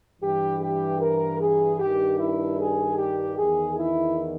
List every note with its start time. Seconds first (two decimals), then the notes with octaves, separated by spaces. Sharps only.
0.22 G2 E3 G4
0.60 G4
1.00 A#4
1.40 G#4
1.79 G2 D#3 G4
2.18 E4
2.58 G#4
2.97 G4
3.37 E2 D#3 G#4
3.77 E4